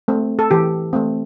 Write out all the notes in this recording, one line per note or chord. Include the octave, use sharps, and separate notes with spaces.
A3 C4
A4
E3 G4
A3 C4